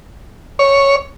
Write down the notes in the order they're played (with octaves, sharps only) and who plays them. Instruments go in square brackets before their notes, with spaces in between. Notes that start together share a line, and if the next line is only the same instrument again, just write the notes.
[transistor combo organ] C#5